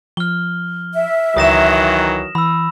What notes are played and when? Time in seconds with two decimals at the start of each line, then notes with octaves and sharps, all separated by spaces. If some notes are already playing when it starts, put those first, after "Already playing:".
0.17 F3 F6 G7
0.93 E5
1.37 C#2 D#3 E3 F#3 D#6 A#6 E7
2.35 E3 B5 E6